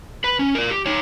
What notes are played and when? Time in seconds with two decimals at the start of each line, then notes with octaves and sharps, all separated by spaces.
0.24 B4 B5
0.39 C#4
0.55 A#4 D5
0.70 G4
0.86 D#4 C#5